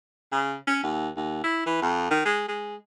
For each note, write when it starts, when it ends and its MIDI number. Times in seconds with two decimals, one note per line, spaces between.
0.32 0.54 49
0.67 0.78 61
0.83 1.09 39
1.16 1.44 39
1.44 1.63 64
1.66 1.81 52
1.82 2.08 41
2.11 2.20 51
2.25 2.43 56
2.48 2.75 56